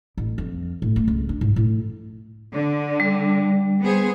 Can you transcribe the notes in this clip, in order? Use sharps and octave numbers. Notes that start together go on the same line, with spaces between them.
A1
F2
A2
A3
C#2
D4
G#2
A2
D3
G3
B3 G#4 C5